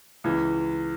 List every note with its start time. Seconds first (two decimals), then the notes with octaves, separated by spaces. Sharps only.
0.24 C#2 E3